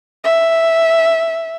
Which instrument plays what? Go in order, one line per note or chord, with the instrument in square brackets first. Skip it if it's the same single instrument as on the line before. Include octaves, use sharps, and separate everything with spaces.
[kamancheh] E5